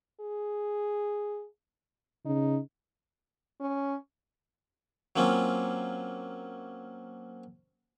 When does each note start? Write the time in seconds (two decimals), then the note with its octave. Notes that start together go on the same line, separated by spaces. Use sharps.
0.20 G#4
2.25 C#3 D#4
3.60 C#4
5.16 F#3 A#3 C4 C#4 F4